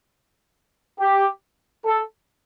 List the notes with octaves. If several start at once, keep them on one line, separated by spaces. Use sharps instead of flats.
G4
A4